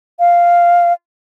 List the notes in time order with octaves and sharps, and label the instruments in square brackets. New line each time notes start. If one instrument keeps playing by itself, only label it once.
[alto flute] F5